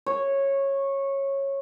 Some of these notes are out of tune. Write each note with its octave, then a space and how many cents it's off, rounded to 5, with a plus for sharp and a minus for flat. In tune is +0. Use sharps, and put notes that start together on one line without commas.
C#5 -15